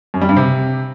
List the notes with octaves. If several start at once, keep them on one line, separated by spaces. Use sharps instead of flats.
F#2
G3
G2
C3